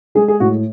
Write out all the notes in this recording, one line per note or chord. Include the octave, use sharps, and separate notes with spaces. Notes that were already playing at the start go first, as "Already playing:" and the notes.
G#3 G#4
G#4
A2 F#4